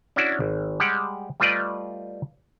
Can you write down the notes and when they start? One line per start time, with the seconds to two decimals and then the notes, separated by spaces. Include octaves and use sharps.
0.16 C#4 D4 E4 F#4 D5
0.40 G#1
0.80 G3 G#3 G4 F#5
1.40 G3 A3 F4 B4 D5 D#5